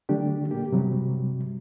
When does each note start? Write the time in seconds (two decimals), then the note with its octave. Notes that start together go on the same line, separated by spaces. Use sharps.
0.09 D3 F#3 A3 D4 G4
0.51 A#2 A#3 G4
0.71 G2 C3 F#3 G3